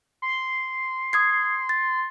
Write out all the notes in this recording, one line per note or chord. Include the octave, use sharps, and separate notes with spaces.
C6
D#6 G#6 C7
A6